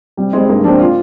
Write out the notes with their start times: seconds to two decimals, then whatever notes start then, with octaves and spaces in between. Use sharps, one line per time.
0.17 C3 G3
0.33 G3 G#3 C4
0.49 G2 A#3
0.64 F3 C4 D4
0.79 F4